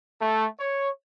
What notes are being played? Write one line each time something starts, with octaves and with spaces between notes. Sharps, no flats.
A3
C#5